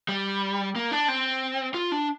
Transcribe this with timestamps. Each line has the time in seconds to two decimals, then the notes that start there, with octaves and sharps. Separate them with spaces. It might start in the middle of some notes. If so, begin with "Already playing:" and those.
0.08 G3
0.76 A#3
0.91 D4
1.08 C4
1.74 F4
1.92 D4